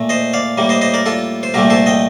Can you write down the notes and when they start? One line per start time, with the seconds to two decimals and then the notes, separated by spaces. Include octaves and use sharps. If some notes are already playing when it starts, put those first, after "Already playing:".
Already playing: A#2 A3
0.09 C5 D#5
0.33 D5 F5
0.58 A2 G3 A#3
0.69 C5 D#5
0.81 C5 D#5
0.94 A#4 D5
1.06 F4 A4
1.43 C5
1.54 C2 A#2 A3 G4 A#4
1.70 A4 C5
1.86 D#5 G5